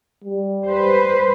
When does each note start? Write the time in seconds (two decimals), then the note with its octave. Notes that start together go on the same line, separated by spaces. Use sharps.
0.24 G3
0.66 B4 C5